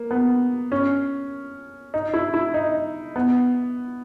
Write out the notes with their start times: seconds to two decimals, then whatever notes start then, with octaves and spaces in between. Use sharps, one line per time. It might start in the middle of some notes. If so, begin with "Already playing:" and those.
Already playing: A#3
0.11 B3
0.72 C#4
1.94 D#4
2.14 E4
2.34 E4
2.54 D#4
3.16 B3